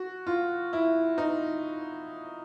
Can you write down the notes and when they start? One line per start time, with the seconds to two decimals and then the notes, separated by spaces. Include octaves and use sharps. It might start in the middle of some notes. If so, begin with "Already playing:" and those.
Already playing: F#4
0.27 F4
0.73 E4
1.18 D#4